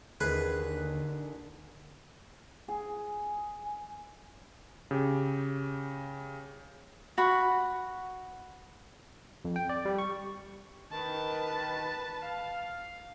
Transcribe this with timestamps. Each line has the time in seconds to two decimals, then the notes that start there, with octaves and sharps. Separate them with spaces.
0.21 D#2 D3 D#3 G#4 B4
2.68 G#4
4.91 C#3 G4
7.18 F#4 F#5 B5
9.45 F2
9.56 G5
9.69 D5
9.85 G3
9.99 C#6
10.91 D#3 B4 A5
12.22 F5